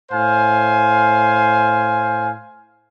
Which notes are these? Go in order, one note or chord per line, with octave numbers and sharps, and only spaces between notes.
A2 C5 F5 G#5